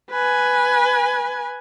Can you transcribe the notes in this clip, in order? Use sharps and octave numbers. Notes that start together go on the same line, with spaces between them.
B4 G#5